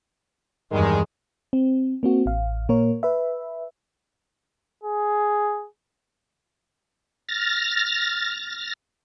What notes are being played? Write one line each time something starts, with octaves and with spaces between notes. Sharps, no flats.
E2 G2 D#3 G#3
C4
A#3 C4 F#4
A1 F5
A#2 A#3 A#4 C#5
B4 E5
G#4
F6 A6 A#6